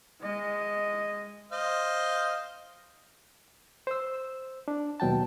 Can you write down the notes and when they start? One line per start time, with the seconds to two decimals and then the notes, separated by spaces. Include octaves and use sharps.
0.21 G#3 D#5
1.52 C5 D#5 F5
3.87 C5 E6
4.68 D4
5.00 D#2 B2 F#3 G5 A5